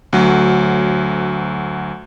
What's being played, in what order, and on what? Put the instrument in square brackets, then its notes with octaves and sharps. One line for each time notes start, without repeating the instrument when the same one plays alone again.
[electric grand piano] D2 F#3